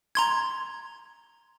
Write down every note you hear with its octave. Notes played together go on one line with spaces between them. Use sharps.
A#5 C6 G#6